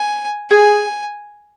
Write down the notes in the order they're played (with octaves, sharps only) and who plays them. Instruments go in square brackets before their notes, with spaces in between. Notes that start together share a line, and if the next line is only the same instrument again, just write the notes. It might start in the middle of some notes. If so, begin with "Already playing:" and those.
Already playing: [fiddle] G#5
[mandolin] G#4 [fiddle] G#5